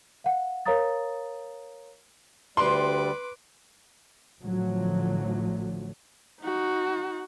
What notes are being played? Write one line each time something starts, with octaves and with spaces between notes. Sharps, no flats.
F5 F#5
A#4 C#5 F5 A#5 D#6 A6
D2 G3 B4 C6 D6
A1 D3 F3 F#3 A3
D#4 F#4